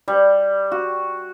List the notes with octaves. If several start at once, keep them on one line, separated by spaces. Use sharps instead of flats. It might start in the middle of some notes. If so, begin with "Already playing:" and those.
G3
F#4